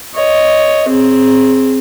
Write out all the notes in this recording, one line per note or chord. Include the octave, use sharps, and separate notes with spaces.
C#5 D#5
C4 G#4